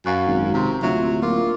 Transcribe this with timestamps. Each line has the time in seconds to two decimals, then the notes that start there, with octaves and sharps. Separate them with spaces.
0.06 F#2 F5 C#6 F#6
0.27 G#1
0.54 C3 A#5 C6
0.82 D1 F#3 F4 E5 C#6
1.22 A#3 F4 A#4 D6